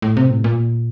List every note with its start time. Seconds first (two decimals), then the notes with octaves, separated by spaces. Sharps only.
0.02 A2
0.17 C3
0.31 A2
0.44 A#2